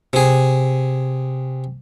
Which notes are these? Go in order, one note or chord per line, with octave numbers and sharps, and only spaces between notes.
C3 G#4